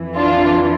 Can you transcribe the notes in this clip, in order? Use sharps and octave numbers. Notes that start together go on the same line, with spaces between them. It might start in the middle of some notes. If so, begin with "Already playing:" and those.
Already playing: F2 E3
D4 F4